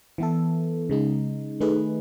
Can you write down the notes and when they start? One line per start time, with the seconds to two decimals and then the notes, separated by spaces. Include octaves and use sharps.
0.18 E3 B3 E4 A4
0.90 C#3 G#3 D#4
1.60 D#3 A3 D#4 G#4 B4